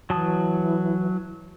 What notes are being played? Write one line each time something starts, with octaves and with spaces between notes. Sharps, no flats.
E3 F#3 A5 D#6